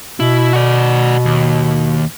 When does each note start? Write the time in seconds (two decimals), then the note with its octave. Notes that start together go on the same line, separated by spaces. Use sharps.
0.20 B2 E4
0.53 F#4 D5
1.25 D#2